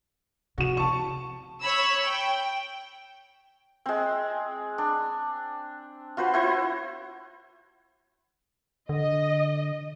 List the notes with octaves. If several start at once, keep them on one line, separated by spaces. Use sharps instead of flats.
C3 F3 F#4 E7
A5 C#6
C#5 B5 E6
G5
G#3 C4
D4
F4 F#4 B4 C5
E4 F#4 B4 C5
D3 D#5